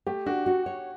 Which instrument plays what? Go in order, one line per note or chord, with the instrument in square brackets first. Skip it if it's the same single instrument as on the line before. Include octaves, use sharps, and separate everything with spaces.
[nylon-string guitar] A3 [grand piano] G4
[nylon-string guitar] D4 [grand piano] F#4
[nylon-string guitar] F#4
C#5